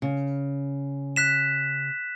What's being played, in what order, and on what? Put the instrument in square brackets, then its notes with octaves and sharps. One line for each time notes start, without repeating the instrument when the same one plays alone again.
[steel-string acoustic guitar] C#3
[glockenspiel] F#6 B6 E7